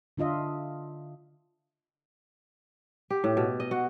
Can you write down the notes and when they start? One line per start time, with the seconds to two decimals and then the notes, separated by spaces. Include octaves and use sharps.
0.17 D3 D4 F4 D#5 E5
3.10 G4
3.24 A2
3.37 B2
3.60 D#5
3.71 F#4